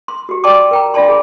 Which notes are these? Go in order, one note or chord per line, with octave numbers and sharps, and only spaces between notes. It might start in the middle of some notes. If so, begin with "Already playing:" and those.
C6
F#4 G4
D5 G5 A5 C6 D6
A#4 G5 A#5
D4 F4 D5 A5 C6
G#4